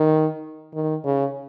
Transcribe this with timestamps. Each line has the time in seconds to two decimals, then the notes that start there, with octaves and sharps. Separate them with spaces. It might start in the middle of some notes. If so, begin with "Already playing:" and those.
Already playing: D#3
0.74 D#3
1.05 C#3